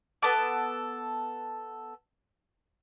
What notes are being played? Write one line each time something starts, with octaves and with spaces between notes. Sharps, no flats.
B3 A4 A5 D6